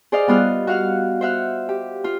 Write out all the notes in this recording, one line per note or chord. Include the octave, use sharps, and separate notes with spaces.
G#4 C5 D5 D#5 F5
G3 B3 F4 D#6 F6 F#6
F#4 F5 F#5 F6
C5 E5 F#5 F6
G4
F4